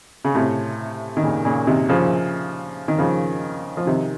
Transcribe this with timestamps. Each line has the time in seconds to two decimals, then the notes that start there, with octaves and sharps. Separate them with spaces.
0.25 C#3
0.35 A2 C3
1.17 D#3
1.23 A#2 C#3
1.45 A#2 C#3
1.67 C3 D#3
1.89 C#3 F3
2.88 D#3
2.99 C#3 F3
3.77 F3
3.87 C3 D#3